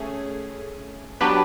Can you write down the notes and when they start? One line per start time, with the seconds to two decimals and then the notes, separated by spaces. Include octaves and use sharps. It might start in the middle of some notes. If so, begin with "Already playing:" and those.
Already playing: A3 C#4 G#4
1.21 F#3 B3 D4 G4 B4